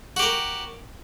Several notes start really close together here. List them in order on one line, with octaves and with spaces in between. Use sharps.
F#4 G4 A#4